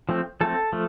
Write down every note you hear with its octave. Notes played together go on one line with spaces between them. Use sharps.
F3 A3 C4
F3 A3 C4 A4
F3 A3